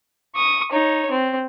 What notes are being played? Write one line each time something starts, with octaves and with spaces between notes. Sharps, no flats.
C#6 D#6
D#4 C#5
C4